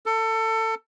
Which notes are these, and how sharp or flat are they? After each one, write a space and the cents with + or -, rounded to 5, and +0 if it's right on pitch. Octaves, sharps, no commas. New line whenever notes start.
A4 +25